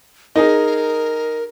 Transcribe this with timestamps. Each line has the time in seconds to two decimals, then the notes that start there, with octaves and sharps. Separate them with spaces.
0.36 D#4 G#4 A#4